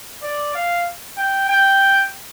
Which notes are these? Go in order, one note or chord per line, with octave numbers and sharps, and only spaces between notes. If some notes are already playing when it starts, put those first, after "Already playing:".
D5
F5
G5
G5